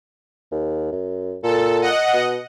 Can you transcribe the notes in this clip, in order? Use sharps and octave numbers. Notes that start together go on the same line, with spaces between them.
D#2
F#2
A#2 A4
D#5 F#5
B2